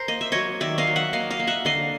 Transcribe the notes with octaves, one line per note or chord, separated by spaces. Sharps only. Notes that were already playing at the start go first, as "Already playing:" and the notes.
Already playing: A#4 C5
A#3 D#5
E5
F#3 C#5 D#5
D#3 D5 E5
D#5 F5
F#3
E5 F#5
A#3 D#5 F5
D#5 F5
A#3
E5 F#5
D3 D#5 F5